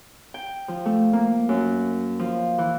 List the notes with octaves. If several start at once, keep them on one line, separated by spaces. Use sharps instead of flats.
G5
F3
A3
A#3
F#2
F3
E3